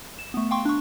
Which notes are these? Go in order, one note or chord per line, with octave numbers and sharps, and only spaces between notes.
E7
A3 B3
F5 G5 C6 C#6
D4 C#6